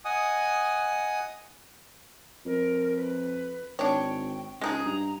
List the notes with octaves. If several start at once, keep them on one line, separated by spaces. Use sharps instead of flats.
D#5 F#5 G#5 D#6
F2 A#4
B4
G#1 D4 C#5 G5
C#2 G#3 D#4 G#4 D#6
G2 A#5